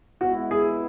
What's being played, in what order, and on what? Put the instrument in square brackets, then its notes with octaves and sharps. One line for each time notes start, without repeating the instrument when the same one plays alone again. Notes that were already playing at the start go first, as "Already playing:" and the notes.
[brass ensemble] G#3 B3 E4 [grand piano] F#4
[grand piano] G#4